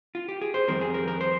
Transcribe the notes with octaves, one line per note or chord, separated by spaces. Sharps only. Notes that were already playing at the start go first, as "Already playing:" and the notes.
F4
G4
G#4
C5
F2 D#3 G3 C4 A#4
G#4
A#4
A#4
C5